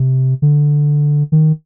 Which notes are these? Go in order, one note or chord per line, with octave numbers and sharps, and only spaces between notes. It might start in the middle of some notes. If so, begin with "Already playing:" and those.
Already playing: C3
D3
D#3